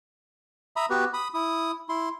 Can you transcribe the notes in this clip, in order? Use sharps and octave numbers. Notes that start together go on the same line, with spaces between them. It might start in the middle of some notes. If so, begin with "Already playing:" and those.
E5 A#5 B5 D#6
B3 F#4 G4 B4
B5 D#6
E4 D#6
E4 C6